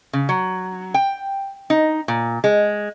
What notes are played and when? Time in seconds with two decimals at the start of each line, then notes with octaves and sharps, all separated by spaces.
0.13 C#3
0.29 F#3
0.94 G5
1.70 D#4
2.08 A#2
2.44 G#3